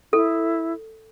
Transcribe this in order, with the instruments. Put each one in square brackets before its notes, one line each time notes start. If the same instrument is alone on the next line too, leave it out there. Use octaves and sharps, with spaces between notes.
[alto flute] E4 [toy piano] A4